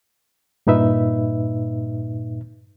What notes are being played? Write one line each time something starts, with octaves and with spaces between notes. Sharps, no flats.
G2 A#2 D#4 B4 E5